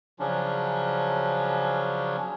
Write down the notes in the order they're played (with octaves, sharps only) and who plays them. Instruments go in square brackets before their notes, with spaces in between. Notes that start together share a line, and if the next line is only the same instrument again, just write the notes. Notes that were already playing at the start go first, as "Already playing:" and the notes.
[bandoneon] C#3 F3 F#3 C#4 D4